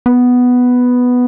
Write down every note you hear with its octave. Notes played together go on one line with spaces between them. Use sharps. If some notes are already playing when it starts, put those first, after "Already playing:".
B3